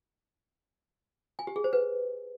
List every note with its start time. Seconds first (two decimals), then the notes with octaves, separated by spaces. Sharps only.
1.39 G#5
1.47 G4
1.56 G#4
1.64 C5
1.73 B4